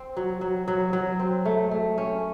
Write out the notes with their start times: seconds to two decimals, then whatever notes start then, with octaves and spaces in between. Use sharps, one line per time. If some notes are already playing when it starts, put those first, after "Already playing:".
Already playing: C4
0.17 F#3
0.41 F#3
0.68 F#3
0.93 F#3
1.20 C4
1.45 A3
1.71 A3
1.98 C#4